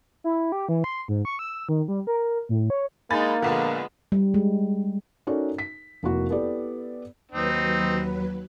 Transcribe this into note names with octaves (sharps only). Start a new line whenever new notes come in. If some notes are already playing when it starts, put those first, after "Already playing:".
E4
G4
E3
C6
G#2
C#6
E6
D#3
G3
A#4
A2
C#5
G#3 A#3 D#4 G#5 B5 A6
A#1 D3 G#3 B3
G3
G#3
C#4 D#4 F#4 A4 A#4 D5
B6
F1 A#3 E4 F#4
B3 E4 G4 A4 D5
D#2 F#3 C4 D#4 B4